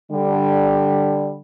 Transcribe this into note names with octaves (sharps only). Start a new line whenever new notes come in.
D3 G3